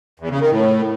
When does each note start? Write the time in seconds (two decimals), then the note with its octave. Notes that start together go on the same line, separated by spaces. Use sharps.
0.20 E2
0.30 C#3
0.40 D#3
0.51 A2